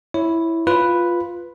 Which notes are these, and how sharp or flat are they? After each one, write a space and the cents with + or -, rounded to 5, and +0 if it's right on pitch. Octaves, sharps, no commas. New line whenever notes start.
E4 +0 C#5 +0
F4 +0 B4 +0